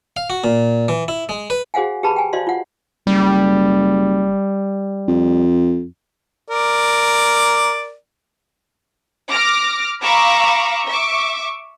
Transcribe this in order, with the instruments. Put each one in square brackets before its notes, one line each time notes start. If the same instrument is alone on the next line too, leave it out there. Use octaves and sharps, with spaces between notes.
[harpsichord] F5
F#4
A#2
E3
E4
G#3
B4
[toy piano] F#4 G#4 C5 F5 F#5 G#5
G4 G#4 B4 A5 B5
G5 G#5
F#4 C5 D5 D#5 F5 C6
F4 F#5
[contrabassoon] F#1 [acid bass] G3
[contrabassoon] F2
[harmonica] A#4 D5
[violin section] D6 F6 A#6
F5 A#5 B5 C#6 D6 E6
E5 C#6 D6